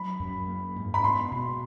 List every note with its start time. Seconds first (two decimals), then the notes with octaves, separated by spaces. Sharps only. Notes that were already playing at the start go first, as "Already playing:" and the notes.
Already playing: F#3 B5
0.20 F#2
0.48 A#3
0.76 G#2
0.94 B5
1.04 B3 C6
1.31 B2